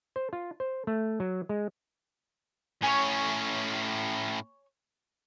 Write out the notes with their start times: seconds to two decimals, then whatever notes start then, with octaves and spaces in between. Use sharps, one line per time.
0.16 C5
0.33 F4
0.60 C5
0.87 A3
1.20 F#3
1.49 G#3
2.82 A2 C#4 C#5 G#5